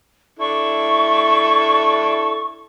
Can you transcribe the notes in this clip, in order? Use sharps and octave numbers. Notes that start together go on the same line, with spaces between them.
D4 E4 A4 C#6